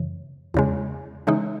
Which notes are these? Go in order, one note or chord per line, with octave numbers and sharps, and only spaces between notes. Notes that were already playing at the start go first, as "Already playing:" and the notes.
Already playing: F#2 C#3 E3
E2 C#3 G#3
C#3 E3 G#3 D#4